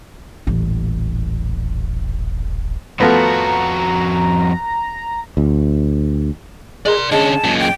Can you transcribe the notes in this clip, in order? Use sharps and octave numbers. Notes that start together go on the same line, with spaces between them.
D#1 A1
F2 F3 A3 B3 F#4 A#5
D2
G#3 A#4 D5 C6
A#4
D3 G#3 C#4 A5
F#2 A#2
G5